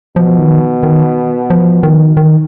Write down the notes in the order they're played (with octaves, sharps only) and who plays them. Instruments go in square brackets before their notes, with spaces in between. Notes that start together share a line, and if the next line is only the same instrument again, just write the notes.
[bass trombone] B2 [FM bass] F3
[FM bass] D#3
D#3
F3
D#3
D#3